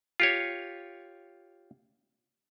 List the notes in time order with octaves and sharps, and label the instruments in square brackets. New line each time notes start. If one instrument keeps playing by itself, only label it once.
[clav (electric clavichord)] F4 G4 C#5